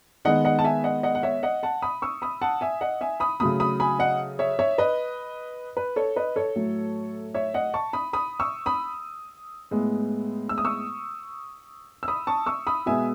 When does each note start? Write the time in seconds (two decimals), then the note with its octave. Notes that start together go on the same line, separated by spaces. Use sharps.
0.25 D#3 G#3 B3 D#5 F#5
0.45 D#5 F#5
0.59 A5
0.65 E5 G#5
0.84 D#5 F#5
1.03 D#5 F#5
1.15 F#5
1.23 C#5 E5
1.43 D#5 F#5
1.63 F#5 A5
1.82 B5 D#6
2.02 C#6 E6
2.22 B5 D#6
2.42 F#5 A5
2.61 E5 G#5
2.81 D#5 F#5
3.01 E5 G#5
3.20 B5 D#6
3.40 C#3 F#3 A3 B5 D#6
3.60 B5 D#6
3.80 G#5 B5
3.99 D#5 F#5
4.39 C#5 E5
4.59 C#5 E5
4.78 B4 D#5
5.77 B4
5.96 A4 C#5
6.16 B4 D#5
6.36 A4 C#5
6.56 A2 F#3 A3
7.34 C#5 E5
7.54 D#5 F#5
7.74 A5 C#6
7.93 B5 D#6
8.13 B5 D#6
8.40 C#6 E6
8.66 B5 D#6
9.71 A2 G#3 B3
10.49 E6
10.58 D#6
10.65 C#6 E6
12.03 E6
12.08 B5 D#6
12.27 A5 C#6
12.46 C#6 E6
12.67 B5 D#6
12.86 B2 G#3 B3 E5 G#5